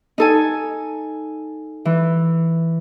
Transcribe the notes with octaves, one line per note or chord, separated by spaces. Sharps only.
D#4 A4 G#5
E3